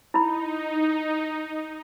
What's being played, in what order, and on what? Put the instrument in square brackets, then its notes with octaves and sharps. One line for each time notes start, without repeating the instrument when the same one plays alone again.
[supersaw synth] D#4 [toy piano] E4 B5